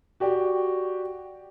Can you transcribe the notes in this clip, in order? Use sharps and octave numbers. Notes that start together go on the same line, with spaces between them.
F#4 G4 D5